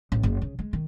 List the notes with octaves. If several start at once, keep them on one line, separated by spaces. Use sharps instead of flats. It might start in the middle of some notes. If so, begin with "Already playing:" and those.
A1
F#1
C#3
G#3
D#3